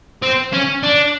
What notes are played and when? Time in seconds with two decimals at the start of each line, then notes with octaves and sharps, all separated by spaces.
0.22 C4
0.53 C#4
0.83 D4